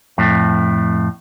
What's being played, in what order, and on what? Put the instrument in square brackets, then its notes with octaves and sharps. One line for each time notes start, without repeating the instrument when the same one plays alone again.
[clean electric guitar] F2 A2